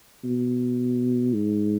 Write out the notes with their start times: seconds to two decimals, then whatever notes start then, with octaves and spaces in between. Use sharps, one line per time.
0.24 B2
1.34 G#2